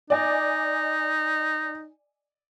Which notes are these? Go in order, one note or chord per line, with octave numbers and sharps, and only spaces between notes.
D#4 D5 D#5 G#5